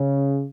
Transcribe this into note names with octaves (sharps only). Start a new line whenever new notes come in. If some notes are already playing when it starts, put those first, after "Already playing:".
Already playing: C#3